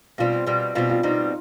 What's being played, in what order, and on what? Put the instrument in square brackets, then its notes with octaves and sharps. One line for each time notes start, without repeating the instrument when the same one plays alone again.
[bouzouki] B2 G3 C4 [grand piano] F4
[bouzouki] B2 G3 C4
[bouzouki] B2 G3 C4 [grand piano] F4
[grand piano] F4
[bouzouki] B2 G3 C4 [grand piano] D#4